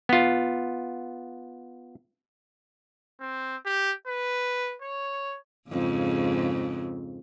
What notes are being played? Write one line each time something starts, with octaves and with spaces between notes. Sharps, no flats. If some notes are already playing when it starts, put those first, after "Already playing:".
B3 F4
C4
G4
B4
C#5
F2 G#2 C#3